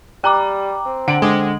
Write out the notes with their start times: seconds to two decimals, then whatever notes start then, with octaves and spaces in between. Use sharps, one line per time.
0.24 G3 G5 A#5 D6 F#6
0.86 C4
1.08 D3 F#5 D7 F#7
1.22 D3 G#3 D6